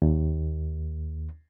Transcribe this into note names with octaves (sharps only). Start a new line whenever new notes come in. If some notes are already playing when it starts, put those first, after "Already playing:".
D#2